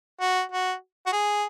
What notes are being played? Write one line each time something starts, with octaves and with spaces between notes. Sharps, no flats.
F#4
F#4
F#4
G#4